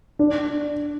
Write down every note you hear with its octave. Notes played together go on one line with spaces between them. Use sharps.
D4